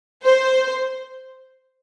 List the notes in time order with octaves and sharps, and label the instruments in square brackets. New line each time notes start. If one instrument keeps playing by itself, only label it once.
[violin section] C5